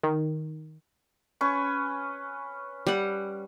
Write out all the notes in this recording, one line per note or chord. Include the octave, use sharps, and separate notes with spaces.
D#3
C#4 B4 C#6
G3 F#5